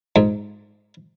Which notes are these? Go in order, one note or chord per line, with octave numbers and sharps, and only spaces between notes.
G#2